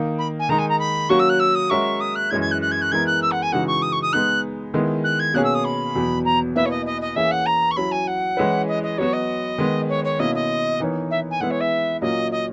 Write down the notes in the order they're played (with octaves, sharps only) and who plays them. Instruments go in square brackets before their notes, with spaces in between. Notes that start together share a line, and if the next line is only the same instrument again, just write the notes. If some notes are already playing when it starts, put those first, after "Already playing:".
Already playing: [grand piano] D#3 A#3 D#4
[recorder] B5
G#5
[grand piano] D#3 G#3 D#4 [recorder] A#5
[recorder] G#5
A#5
B5
[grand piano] F#3 A#3 C#4 F#4 [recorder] C#6
[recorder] E6
F#6
E6
D#6
[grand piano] G#3 C#4 F#4 A#4 E5 [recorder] C#6
[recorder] D#6
F#6
[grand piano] F#2 E3 G#3 C#4 E4 [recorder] G#6
[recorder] G#6
F#6
F#6
G#6
F#6
[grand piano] E3 G#3 B3 E4 A#4 [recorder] G#6
[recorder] F#6
E6
F#5
G#5
[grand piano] C#3 E3 G#3 D#4 F#4 [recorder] F#5
[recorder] C#6
D#6
C#6
D#6
[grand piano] G#3 B3 D#4 [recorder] F#6
[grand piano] D#3 G#3 B3 E4
[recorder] F#6
G#6
[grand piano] B2 A#3 C#4 G#4 [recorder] F#6
[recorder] E6
D#6
B5
[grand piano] E2 B2 F#3 B3
[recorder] A#5
[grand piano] B2 A#3 E4 B4 [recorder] E5
[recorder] C#5
D#5
D#5
D#5
[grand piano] E3 A#3 C#4 G#4 [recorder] E5
[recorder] F#5
A#5
C#6
[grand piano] F#3 C#4 E4 [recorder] B5
[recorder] G#5
F#5
[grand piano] E3 G#3 C#4 E4 B4
[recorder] D#5
D#5
[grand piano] F#3 B3 F#4 [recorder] C#5
[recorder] D#5
[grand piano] D#3 G#3 B3
[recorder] C#5
C#5
[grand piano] B2 A#3 C#4 E4 [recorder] D#5
[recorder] D#5
[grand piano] E3 B3 D#4 A#4 C#5
[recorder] E5
G#5
[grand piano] E3 G#3 B3 E4 [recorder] F#5
[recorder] C#5
E5
[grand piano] A#2 F#3 A#3 C#4 [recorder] D#5
[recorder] D#5